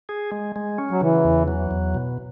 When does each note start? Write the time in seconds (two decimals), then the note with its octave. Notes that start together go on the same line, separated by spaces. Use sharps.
0.09 G#4
0.32 G#3
0.56 G#3
0.78 C#4
0.91 F#3
1.01 C#3 E3
1.24 E2
1.48 F#3
1.71 E2
1.95 B2